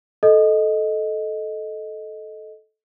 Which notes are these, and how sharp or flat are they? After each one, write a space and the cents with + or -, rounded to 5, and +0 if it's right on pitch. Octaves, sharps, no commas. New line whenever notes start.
A4 -10 D#5 +0